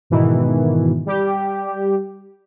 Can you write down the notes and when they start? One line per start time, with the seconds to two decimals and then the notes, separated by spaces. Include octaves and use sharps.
0.10 G#2 B2 D#3 E3
1.06 G3 G4